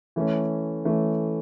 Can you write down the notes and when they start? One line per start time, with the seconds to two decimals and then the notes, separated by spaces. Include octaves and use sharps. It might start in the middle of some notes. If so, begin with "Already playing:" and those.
0.16 E3 A3 C#4
0.85 E3 A3 C#4